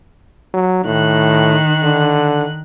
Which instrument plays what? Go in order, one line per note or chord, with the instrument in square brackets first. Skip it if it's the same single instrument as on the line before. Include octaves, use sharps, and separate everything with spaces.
[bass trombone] F#3
[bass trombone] A2 [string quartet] D#3 F#6
[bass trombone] D3